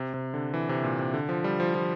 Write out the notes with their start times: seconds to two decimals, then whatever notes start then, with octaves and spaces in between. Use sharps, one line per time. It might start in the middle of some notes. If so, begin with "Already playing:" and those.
Already playing: C3
0.14 C3
0.34 D3
0.54 E3
0.69 C3
0.84 A#2
0.99 C3
1.14 D3
1.29 F3
1.44 G3
1.60 F3
1.75 F3